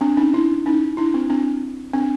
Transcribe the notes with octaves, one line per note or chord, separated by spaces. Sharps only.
C4 D4
C#4 D#4
D4 E4
C#4 D#4
D4 E4
C4
C4 D4
C4 D4